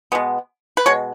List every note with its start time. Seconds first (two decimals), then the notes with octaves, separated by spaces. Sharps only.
0.12 B2 G#3 B3
0.77 B4
0.86 B2 G#3 C#5